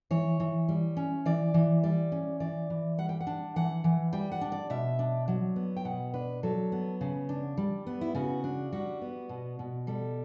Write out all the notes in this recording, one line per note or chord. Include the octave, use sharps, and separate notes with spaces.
E3 C#5
E3
G3
C#4
E3 D5
E3
G3 D5
C#4
E3 D5
E3
G3 F#5
G5
F#5
D4
E3 F#5
E3
G3 G5
F#5
D4
D5
B2 E5
D4
F#3
B3
G5
B2 F#5
D4 B4
F#3 A4
B3
C#3
D4
G3
B3
E4
C#3 F#4
D4
G3 F#4
B3
B2
B2
G3 A4